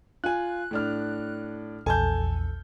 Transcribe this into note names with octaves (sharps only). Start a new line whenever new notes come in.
F4 G#5 F#6
A2 D4 F6
A#1 E2 A4 G#5 A5 G6